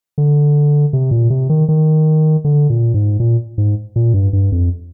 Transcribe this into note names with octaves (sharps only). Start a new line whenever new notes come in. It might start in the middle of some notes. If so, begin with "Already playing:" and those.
D3
C3
A#2
C3
D#3
D#3
D3
A#2
G#2
A#2
G#2
A#2
G2
G2
F2